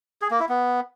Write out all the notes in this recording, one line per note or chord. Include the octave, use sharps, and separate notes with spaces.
G#4
A#3
E4
B3